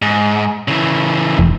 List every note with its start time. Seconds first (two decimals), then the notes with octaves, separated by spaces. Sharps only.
0.02 G#2
0.68 C#3 E3
1.38 F1